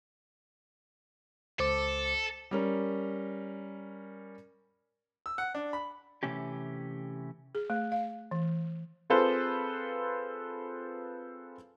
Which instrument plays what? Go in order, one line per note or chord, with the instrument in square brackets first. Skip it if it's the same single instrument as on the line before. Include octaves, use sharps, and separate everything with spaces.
[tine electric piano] C#2 C5 D6 [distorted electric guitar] A4
[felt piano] G3 C#4 A#4
[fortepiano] E6
F#5
D4
B5
[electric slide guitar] C3 E3 A3 C#4 G4
[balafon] G#4
A3
F5
E3
[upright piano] C4 F4 G#4 A4 B4 C5